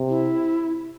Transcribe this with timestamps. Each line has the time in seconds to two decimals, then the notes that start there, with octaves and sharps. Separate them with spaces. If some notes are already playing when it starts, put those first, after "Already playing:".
Already playing: C3
0.09 E4